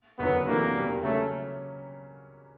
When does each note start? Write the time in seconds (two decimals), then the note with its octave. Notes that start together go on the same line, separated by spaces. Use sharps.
0.18 F#1 F#2 D3 F#3 B3
0.47 C3 E3 A3 A#3 D4 F#4
0.75 E2 B2 G3
1.02 C#3 F#3 A3 A#3 C#4